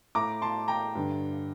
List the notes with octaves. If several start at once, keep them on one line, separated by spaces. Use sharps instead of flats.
A2 A#5 D6
A5 C6
G5 A#5
G2 D3